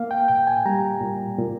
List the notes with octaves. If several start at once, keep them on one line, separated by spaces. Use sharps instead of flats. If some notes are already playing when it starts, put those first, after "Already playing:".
Already playing: A#3 F5
G5
A#2 G5
G#5
G3 A#5
A#2
A#2